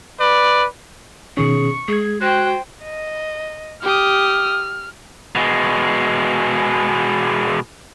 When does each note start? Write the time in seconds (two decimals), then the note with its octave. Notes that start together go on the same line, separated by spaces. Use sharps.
0.18 B4 D5
1.37 B2 D#3 C#4 G#4 C#6
1.88 G#3 G#4 G#6
2.21 F#4 C5 G5 F#6
2.84 D#5
3.83 G4 D#6 F6
5.35 B2 G#3